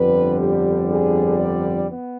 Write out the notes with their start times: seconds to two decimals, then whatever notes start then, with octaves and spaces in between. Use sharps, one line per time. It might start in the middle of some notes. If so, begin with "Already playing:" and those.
Already playing: G1 F2 D3 G3 B4
0.39 G4
0.89 G#4
1.39 D5
1.89 B3